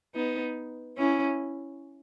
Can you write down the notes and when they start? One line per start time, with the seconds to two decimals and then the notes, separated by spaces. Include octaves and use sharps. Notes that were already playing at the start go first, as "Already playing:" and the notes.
0.15 B3 D#4
0.97 C#4 E4